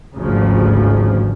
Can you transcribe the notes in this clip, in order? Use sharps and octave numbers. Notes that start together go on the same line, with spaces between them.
G#1 D2 G2 C#3 F3